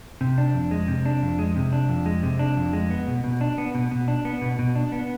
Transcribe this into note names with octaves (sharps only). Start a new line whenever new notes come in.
C3
D4
F2
G#3
C3
D4
F2
G#3
C3
D4
F2
G#3
C3
D4
F2
G#3
B3
B2
B2
D4
B3
B2
B2
D4
B3
B2
B2
D4
B3